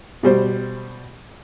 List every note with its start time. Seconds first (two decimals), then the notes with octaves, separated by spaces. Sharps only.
0.23 B2 G3 C5